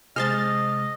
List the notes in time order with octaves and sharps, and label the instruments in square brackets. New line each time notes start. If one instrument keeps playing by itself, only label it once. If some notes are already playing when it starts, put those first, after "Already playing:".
[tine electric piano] C3 G#3 [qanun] G#4 C5 A5 [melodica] D#5 [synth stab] F6 A6